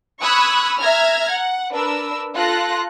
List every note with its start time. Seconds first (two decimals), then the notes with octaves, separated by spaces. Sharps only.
0.21 B5 C#6 D#6 E6 F#6 G#6
0.79 E5 A#5 F6 G#6
1.31 F#5
1.73 D4 A#4 B4 E6
2.35 F4 A4 F#6 A#6